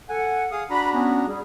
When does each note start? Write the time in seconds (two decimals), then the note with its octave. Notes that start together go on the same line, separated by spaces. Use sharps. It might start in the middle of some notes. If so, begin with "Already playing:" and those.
0.09 A4 F#5 G#5
0.52 G#4 F5 D#6
0.71 D4 F#4 A#5 B5
0.94 B3 C#4
1.27 G3 G#4